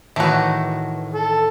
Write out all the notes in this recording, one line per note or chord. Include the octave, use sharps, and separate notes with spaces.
A2 D#3 E3 A3 F#4
A4